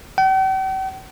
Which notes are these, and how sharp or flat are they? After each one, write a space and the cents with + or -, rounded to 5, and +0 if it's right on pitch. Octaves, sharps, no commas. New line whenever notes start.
G5 -45